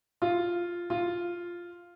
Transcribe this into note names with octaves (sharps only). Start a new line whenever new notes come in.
F4
F4